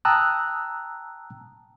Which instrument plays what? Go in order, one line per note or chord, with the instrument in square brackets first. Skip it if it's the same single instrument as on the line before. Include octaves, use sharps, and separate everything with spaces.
[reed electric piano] G5 A5 A#5 D#6 E6 F#6